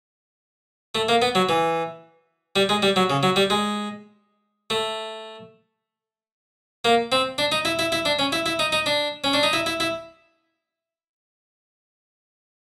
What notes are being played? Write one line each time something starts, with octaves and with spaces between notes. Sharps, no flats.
A3
A#3
B3
F#3
E3
G3
G#3
G3
F#3
C#3
F#3
G3
G#3
A3
A#3
C4
D4
D#4
E4
E4
E4
D4
C#4
E4
E4
D#4
D#4
D4
C#4
D4
D#4
E4
E4
E4